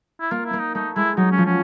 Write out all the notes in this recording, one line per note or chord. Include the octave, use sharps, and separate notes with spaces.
E4
A#3 F4
E4
A#3
D#4
A3 D#4
G#3 E4
F#3 D#4
C#4
F3
C#4